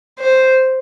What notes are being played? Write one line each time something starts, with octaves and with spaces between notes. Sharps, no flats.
C5